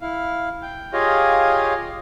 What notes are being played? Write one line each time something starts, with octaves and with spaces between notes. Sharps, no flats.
E4 F5
G5
F4 G4 G#4 C#5 D#5 F5